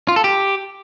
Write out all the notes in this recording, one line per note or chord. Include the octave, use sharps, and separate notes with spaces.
F4
A4
G4